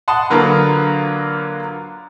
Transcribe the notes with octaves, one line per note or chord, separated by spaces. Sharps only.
F#5 A5 C6 D#6
D3 F#3 A#3 F4 A#4 B4